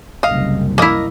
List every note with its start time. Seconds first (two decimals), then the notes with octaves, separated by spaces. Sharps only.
0.23 F#1 C2 G3 D#5 F5
0.78 A#3 E4 A#4 D#5